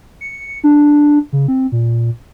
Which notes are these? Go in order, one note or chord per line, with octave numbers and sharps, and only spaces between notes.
C#7
D4
C#3
C4
A#2